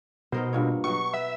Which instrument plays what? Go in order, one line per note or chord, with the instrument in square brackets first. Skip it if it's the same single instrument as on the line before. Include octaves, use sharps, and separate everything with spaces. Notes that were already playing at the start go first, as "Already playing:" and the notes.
[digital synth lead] B2 [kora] D#4 A#4 C5
[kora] G2 A#2 C#5
[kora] B2 F#3 [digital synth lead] C#6
[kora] B3 [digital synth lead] E5